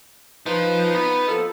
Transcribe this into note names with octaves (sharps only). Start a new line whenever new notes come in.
F3 D#4 B4
B3
F3 A#3 A4